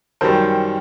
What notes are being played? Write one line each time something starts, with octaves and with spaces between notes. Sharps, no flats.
F#2 D#3 G3 A#4 C5